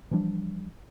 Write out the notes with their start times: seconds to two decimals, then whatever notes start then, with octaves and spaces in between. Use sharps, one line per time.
0.11 E3 F3 G3 D4